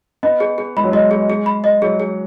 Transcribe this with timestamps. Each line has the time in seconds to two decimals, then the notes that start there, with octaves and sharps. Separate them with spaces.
0.23 B3 D#5
0.40 G#4
0.58 G#4
0.77 G#3 B5
0.84 F#3
0.91 G#3 D#5
1.11 G#4
1.30 G#4
1.46 B5
1.64 D#5
1.82 F#3 G#4
2.00 G#4